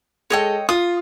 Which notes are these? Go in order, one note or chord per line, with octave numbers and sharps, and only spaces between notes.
G#3 A4 C#5 D#5 G5
F4 D#6